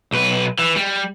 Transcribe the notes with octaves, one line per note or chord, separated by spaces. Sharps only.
B1 B4
E3
G3